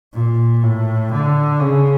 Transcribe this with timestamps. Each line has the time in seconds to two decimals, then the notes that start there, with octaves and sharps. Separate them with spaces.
0.14 A#2
0.64 A2
1.12 D3
1.60 C#3